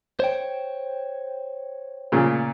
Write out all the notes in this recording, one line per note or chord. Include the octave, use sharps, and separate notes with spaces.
C5 C#5 G5
A#2 C#3